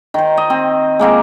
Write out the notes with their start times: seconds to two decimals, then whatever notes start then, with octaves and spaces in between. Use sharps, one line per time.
0.14 D#3 C5
0.37 D#5
0.50 C4
0.99 G#3 A#3 C4 A#4